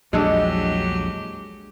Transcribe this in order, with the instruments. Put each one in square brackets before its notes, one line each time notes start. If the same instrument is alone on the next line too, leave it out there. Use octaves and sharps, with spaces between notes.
[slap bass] A#1 E2 [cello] F#3 G4 [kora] G#3 D4 A4